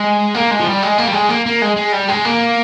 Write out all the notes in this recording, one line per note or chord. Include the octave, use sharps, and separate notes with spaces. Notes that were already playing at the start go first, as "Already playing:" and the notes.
Already playing: G#3
A#3
G#3
F3
G3
G#3
A#3
G3
G#3
A#3
A#3
G#3
G#3
G3
G#3
A#3